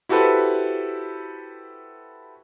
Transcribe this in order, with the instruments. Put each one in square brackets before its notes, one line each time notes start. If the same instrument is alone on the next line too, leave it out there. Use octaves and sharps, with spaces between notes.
[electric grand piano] E4 F#4 G4 A4 B4 C5